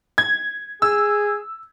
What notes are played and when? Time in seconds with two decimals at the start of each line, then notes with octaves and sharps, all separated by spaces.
0.18 G#6
0.82 G#4 E6